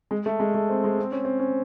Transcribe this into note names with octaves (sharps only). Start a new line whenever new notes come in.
G#3
A3
G#3
A3
C4
G#3
C4
C#4
C4
C#4